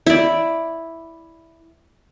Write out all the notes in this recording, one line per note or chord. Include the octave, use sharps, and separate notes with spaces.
E4 D5